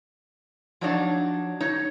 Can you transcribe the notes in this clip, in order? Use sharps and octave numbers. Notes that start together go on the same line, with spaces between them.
F3 F#3 D4 D#4 C#5 D5
D#4 C#5